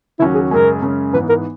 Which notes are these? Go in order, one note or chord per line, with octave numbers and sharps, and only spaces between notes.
D#2 C#3 F#3 C#4 E4 F#4
G#4
F#2 C#3 G#3 C#4 A#4
F#2 C#3 G#3 C#4
G#2 E3 B3 B4
A#4